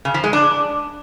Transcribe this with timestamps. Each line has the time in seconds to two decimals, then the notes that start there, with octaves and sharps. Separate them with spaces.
0.05 C#3
0.14 F3
0.24 G#3
0.33 D4